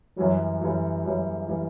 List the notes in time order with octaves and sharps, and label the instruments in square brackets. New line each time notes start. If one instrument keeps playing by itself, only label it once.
[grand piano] F#2 E3 G3 [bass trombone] F#3
[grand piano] F#2 E3 G3 [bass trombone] F#3
[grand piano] F#2 E3 G3 [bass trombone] F#3
[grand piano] E3 G3